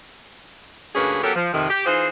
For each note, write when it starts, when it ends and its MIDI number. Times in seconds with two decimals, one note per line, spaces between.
0.95 1.18 38
0.95 1.18 43
0.95 1.18 58
0.95 1.18 61
0.95 1.18 68
0.95 1.18 71
1.23 1.31 54
1.23 1.31 59
1.23 1.31 61
1.23 1.31 67
1.23 1.31 69
1.23 1.31 70
1.35 1.51 53
1.53 1.67 41
1.53 1.67 48
1.53 1.67 51
1.69 1.85 67
1.86 2.08 52
1.86 2.08 63
1.86 2.08 65
1.86 2.08 68
1.86 2.08 72